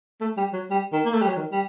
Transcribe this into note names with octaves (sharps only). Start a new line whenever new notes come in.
A3
G3
F#3
G3
D#3
A#3
A3
G3
F#3
D#3
G3